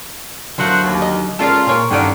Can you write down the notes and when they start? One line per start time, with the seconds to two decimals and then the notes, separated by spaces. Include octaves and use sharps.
0.58 D3 F#3 A3 F4 A#4 C5 F#5
0.82 D#2
1.02 D#5
1.39 G#3 C#4 F4 A4 A#4 D5
1.67 A#2 G#4 A#4 C#5
1.90 G2 D3 D#3 C#4 D5